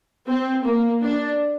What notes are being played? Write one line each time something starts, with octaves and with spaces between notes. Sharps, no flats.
C4
A#3
D4